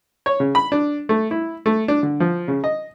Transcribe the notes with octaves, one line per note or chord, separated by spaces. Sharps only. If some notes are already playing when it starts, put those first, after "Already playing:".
C#5
C#3
B5
D4
A3
E4
A3
D4
D3
F3
C#3
D#5